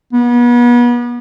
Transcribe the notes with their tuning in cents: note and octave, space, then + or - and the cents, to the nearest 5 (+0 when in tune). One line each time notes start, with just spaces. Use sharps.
B3 -35